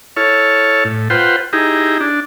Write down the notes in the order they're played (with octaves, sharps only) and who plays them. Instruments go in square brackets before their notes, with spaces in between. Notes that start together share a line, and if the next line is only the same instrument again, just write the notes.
[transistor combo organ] E4 A4 C#5 F6
A2
F4 B4 C5 F#5 G5
D#4 E4 G4 G#4 A#5
D4